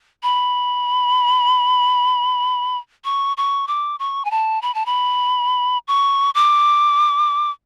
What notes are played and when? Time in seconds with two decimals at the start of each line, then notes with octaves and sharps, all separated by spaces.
0.23 B5
3.05 C#6
3.37 C#6
3.68 D6
3.99 C#6
4.25 G#5
4.31 A5
4.62 B5
4.75 A5
4.86 B5
5.88 C#6
6.35 D6